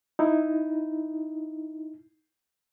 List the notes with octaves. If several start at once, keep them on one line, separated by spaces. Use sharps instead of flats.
D#4 E4